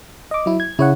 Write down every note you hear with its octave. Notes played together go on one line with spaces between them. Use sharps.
D#5 D6
F#3 E4
G#6
C#3 E4 C#5 F#5